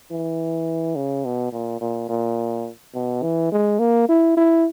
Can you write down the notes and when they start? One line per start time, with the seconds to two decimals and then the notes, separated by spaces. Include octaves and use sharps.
0.11 E3
0.96 C#3
1.25 B2
1.52 A#2
1.81 A#2
2.09 A#2
2.94 B2
3.23 E3
3.52 G#3
3.79 A#3
4.09 E4
4.37 E4